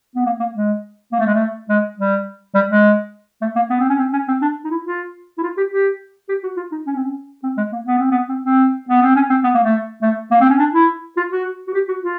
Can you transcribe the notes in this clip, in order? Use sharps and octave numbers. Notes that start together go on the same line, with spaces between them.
B3
A#3
A#3
G#3
A#3
A3
G#3
A3
G#3
G3
G3
G#3
A3
A#3
B3
C4
C#4
C4
C#4
C4
D4
D#4
E4
F4
E4
F4
G4
G4
G4
F#4
F4
D#4
C#4
C4
C#4
C4
G#3
A#3
B3
C4
B3
C4
C4
B3
C4
C#4
C4
B3
A#3
A3
A3
A#3
C4
C#4
D4
E4
F4
F#4
F#4
G4
F#4
F4